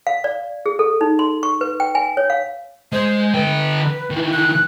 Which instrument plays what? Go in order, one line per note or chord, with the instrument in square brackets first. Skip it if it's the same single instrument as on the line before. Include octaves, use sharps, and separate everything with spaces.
[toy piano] F5
D5
G#4
A4
D#4
C6
C#6
B4
G5
G#5
C#5
F5
[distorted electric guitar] G#3 [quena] C5
[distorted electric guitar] D3 G5 [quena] B4
[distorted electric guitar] D#3 E3
[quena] F#6